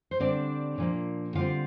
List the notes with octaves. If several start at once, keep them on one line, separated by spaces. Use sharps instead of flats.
C5
D3 G3 C4 D4 D5
A#2 F3 A#3
D3 G3 C4 F4 F5